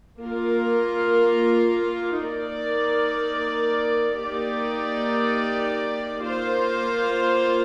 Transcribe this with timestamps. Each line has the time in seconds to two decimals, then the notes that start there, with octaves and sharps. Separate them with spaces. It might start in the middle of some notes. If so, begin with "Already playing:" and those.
0.21 A#3 F4 A#4
2.21 A#3 D#4 A#4 D5
4.21 A#3 D#4 G4 D5
6.20 A#3 F4 C5